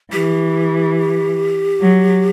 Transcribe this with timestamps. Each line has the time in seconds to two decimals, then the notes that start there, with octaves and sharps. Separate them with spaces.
0.12 E3 G4
1.80 F#3